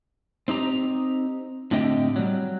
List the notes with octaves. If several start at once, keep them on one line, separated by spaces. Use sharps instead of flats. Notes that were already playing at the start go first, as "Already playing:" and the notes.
C4 D#4 G4 A#5
A2 D3 C4 G4 D#5 G5
F#3 G3